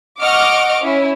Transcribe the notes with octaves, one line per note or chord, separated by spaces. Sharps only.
D#5 F#5 C#6 D6 F6 D7
C#4 E4